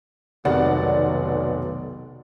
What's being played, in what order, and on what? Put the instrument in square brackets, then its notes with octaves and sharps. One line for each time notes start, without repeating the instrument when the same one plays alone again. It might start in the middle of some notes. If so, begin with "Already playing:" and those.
[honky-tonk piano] F1 D5 F#5 [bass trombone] B1 [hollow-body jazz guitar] D#3 B3